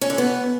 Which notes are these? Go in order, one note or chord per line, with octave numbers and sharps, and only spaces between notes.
C#4
D3
B3